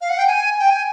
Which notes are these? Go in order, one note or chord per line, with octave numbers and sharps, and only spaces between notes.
F5
F#5
G5
G#5
G5
G#5